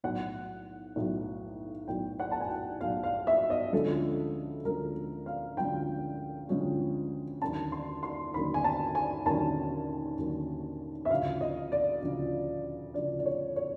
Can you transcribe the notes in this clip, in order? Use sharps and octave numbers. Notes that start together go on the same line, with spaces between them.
B1 A2 F#3 F#5
B1 A2 F#3
B1 A2 F#3 G5
F#5
A5
G#5
G5
B1 A2 F#3 F5
F5
E5
D#5
D2 D3 F3 G#3 C#4 A4
D2 D3 F3 G#3 C#4 A#4
F5
D2 D3 F3 G#3 C#4 G5
D2 D3 F3 G#3 C#4
D#2 D3 F#3 A#3 C#4 A5
C6
C6
D#2 D3 F#3 A#3 C#4 B5
G#5
A5
G#5
D#2 D3 F#3 A#3 C#4 A5
D#2 D3 F#3 A#3 C#4
E5
D2 C#3 F3 F5
D#5
D5
D2 C#3 F3
D2 C#3 F3 D5
D5
C#5
C#5